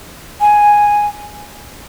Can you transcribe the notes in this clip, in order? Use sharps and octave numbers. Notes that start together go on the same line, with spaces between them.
G#5